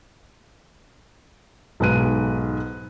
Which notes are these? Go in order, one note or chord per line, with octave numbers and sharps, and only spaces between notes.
B1 G#2 B4 F#6 D#7